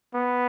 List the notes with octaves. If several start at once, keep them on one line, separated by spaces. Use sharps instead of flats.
B3